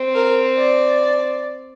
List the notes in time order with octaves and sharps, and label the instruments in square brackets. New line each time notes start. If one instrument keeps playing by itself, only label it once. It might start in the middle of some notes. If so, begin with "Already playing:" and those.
Already playing: [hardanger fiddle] C4
[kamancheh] A#4
D5